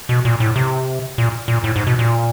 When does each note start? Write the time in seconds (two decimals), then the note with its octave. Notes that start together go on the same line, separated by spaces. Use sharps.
0.09 B2
0.25 A#2
0.40 A2
0.56 C3
1.18 A#2
1.48 A#2
1.64 A2
1.76 G#2
1.87 B2
1.99 A#2